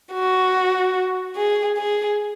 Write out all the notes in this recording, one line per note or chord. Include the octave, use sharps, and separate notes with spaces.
F#4
G#4
G#4